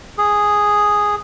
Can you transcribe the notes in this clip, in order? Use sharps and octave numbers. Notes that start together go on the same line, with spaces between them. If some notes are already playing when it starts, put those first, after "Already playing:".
G#4